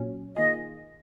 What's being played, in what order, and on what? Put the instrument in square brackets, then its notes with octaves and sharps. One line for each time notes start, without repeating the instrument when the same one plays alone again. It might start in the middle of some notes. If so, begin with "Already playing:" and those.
Already playing: [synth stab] A#2 F#3 C#4
[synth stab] D#3 A#3 F4 G#4 [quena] D#5